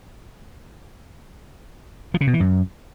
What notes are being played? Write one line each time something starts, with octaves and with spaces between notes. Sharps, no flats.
F3
C#3
B2
E3
F#2